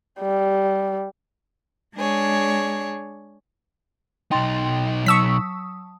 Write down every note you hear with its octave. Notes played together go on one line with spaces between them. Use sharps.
G3
G#3 D4 G#4 C#5
B1 D#4 G5 C6 A6
F#3 A5 C#6 D#6 E6 B6